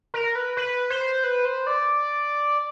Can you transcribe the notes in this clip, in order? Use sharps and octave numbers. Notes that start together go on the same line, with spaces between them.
A#4
B4
B4
C5
B4
C5
D5